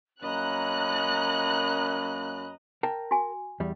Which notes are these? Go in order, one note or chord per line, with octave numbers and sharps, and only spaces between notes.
F#2 A#3 C#4 D#5 A#5 B5 F#6
A#4 G5 A5
F#4 G#5
E2 G3